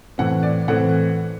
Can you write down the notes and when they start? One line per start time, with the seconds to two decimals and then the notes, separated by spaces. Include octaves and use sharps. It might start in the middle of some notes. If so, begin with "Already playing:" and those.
0.18 A2 E3 A3 C4 F#5
0.43 D5
0.68 A2 E3 A3 C4 F#5